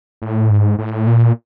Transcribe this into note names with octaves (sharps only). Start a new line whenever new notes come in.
A2
G#2
A2
A#2